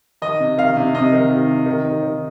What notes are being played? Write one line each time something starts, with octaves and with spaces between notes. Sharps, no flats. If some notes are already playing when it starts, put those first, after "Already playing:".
D#3 D#5
C3
D#3 F5
C3
C3 D#5
D#3
D#3
C3
D#3
D#3
D#3